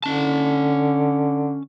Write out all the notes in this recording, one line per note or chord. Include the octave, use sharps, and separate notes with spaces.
D3 C#4 A5